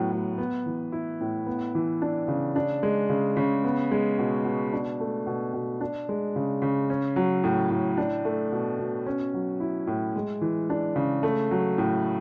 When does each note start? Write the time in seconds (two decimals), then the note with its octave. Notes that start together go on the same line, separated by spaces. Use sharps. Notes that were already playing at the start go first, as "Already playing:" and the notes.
Already playing: A2 F#3 B3
0.12 A2
0.38 B3
0.66 E3
0.92 E4
1.21 A2
1.47 B3
1.75 E3
2.02 D4
2.28 C#3
2.56 D4
2.83 G#3
3.09 C#3
3.37 C#3
3.64 B3
3.91 G#3
4.19 B2
4.45 B2
4.73 D4
5.00 A3
5.26 B2
5.53 B2
5.81 D4
6.09 G#3
6.36 C#3
6.62 C#3
6.90 C#4
7.16 F#3
7.44 A2
7.70 A2
7.97 D4
8.25 A3
8.52 B2
8.79 B2
9.06 C#4
9.34 F#3
9.60 E4
9.87 A2
10.16 G#3
10.41 E3
10.70 D4
10.96 C#3
11.23 A3
11.51 F#3
11.78 A2